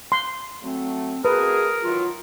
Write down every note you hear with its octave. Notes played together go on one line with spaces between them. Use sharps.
C6
F#3 A3 C4
A3 F#4 G#4 A#4 B4 D#6
D#3 E3 F#3 F4